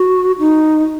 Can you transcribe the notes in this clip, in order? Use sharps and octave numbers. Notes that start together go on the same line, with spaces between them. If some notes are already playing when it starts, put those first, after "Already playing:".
Already playing: F#4
D#4